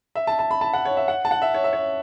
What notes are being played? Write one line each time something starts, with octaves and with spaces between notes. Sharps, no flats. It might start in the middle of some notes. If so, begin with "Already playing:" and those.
E5
A5
A5
B5
A5
F#5
C#5
E5
F#5
A5
F#5
E5
C#5
E5
C#5